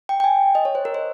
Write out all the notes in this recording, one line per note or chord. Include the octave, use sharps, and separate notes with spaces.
G5
G5
G#5
D#5
C#5
C5
A#4
C5